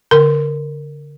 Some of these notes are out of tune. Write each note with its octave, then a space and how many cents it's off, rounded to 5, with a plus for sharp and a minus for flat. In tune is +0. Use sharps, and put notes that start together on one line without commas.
D3 -30 A#4 -15 C6 -20